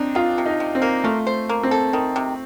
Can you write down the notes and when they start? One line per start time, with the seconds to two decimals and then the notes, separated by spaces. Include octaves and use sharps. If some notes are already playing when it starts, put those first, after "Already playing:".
Already playing: C4 D4 D#4
0.15 D#3 F4
0.38 C3
0.46 D#4
0.60 C3
0.75 C4
0.82 A#3
1.04 A3 F4
1.27 C5
1.49 A#3
1.63 C4
1.71 A4
1.93 D#3
2.16 C3